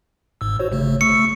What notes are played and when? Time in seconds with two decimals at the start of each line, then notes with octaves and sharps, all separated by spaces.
0.41 G#1 G#2 E6
0.59 F#4 C5 C#5
0.72 G#1 C#3 A3
1.01 A3 C#6 E6 C#7